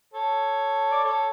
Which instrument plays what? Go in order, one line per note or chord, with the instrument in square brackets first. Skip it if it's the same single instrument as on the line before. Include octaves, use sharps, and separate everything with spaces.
[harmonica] A4 C#5
D5
A4 C#5